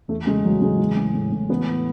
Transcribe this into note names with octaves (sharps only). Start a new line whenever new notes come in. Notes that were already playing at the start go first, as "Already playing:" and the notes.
E2 A3
C#3 G#3
E2 F#3
C#3 G#3
E3
A2
A2
A2
E3 B3